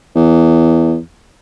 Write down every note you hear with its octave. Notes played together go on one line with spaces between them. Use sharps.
E2